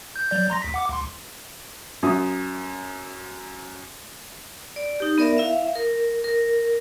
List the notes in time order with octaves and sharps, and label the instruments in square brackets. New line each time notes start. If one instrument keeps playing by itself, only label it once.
[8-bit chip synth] G6
F#3 D5 G6
A#5 C6 A#6
D2 B6
F#5 D6
C#2 C6
[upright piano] F#2 F#3 D#6
[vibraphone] D5
D#4 G4
B3 A#4 D5 E5
E4 E5 F5
A#4
A#4